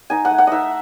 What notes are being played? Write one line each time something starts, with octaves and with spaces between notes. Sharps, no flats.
D#4 G#5
F#5
A3
F#5
D#4 D#5 E5